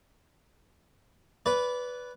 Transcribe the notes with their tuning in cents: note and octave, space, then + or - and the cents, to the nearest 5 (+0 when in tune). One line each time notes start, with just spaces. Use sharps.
B4 +0 D5 -25